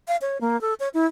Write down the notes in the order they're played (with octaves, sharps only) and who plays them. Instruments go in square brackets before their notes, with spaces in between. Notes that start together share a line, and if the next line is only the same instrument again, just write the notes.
[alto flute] F5
C#5
A#3
A4
C#5
E4